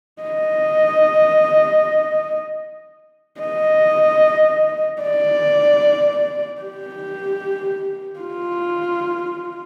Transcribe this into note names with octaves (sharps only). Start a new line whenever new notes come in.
D#5
D#5
D5
G4
F4